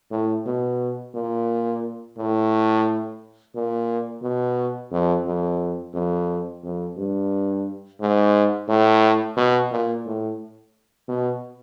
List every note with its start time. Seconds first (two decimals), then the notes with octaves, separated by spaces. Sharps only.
0.11 A2
0.46 B2
1.14 A#2
2.18 A2
3.55 A#2
4.22 B2
4.92 F2
5.26 F2
5.94 F2
6.63 F2
6.97 G2
8.00 G#2
8.69 A2
9.37 B2
9.72 A#2
10.06 A2
11.08 B2